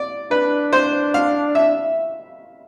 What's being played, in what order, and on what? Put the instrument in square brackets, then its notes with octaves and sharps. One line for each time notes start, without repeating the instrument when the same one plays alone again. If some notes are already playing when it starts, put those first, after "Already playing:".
Already playing: [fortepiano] D5
[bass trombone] D4 [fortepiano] B4
[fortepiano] C5
F5
E5